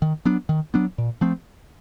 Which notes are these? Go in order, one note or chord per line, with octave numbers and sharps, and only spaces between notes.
D#3
F#3 B3 D4
D#3
F#3 B3 D4
A#2
F3 A3 C4